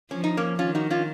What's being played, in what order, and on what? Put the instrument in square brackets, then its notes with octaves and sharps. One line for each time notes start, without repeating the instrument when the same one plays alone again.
[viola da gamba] F3 [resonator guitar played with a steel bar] C#4
[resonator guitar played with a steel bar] D#4
A#3 C#4
[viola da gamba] D#3 [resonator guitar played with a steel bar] C#4 F4
[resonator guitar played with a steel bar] D#4 F#4
C#4 F4